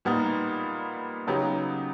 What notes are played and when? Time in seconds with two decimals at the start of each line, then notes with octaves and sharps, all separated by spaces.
0.05 A#2 G3 B3 D#4
1.27 C#3 F#3 B3 D#4 G4